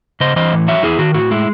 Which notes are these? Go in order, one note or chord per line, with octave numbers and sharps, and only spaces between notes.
C#3 C5 D#5
E3 C5 D#5
A2
F#3 C#5 E5
E2 E4 G#4
D#3 F#4
A2 F#4
G#3 E4